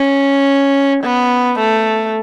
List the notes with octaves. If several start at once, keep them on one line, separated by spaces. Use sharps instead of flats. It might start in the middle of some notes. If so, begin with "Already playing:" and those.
Already playing: C#4
B3
A3